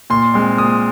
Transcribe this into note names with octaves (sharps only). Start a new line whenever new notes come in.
A#2 C6
G#3 C4
A#2 D#6